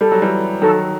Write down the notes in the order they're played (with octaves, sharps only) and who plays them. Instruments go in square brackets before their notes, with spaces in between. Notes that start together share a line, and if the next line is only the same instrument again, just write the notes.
[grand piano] G3 [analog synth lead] A4
[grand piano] F#3
E3 G3
[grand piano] D#3 F#3 [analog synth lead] A4